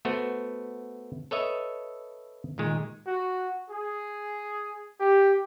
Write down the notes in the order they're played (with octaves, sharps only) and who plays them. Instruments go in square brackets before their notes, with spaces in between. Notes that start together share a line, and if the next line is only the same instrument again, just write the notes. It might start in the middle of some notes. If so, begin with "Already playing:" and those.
[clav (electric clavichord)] A3 B3 F#4 C5
A4 B4 C#5 D#5 E5 A5
A#2 D#3 G#3
[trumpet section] F#4
G#4
G4